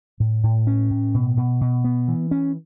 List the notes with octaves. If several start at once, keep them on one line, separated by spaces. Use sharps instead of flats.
A2
A2
C#4
A2
B2
B2
B2
B3
E3
C#4